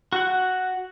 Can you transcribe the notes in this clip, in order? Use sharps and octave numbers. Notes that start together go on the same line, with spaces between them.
F#4 F#5